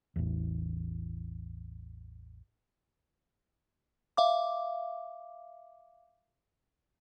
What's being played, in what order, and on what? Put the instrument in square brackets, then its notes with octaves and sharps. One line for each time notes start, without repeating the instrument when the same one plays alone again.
[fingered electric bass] A1 E2
[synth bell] E5 F5 D6